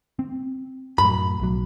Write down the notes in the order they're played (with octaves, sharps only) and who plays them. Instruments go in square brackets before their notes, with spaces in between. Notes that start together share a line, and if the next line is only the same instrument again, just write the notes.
[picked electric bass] C4
[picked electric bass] F#2 A2 F#3 [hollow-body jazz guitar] B5
[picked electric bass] B1 F#3